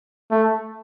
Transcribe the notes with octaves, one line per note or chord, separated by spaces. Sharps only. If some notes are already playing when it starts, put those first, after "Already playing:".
A3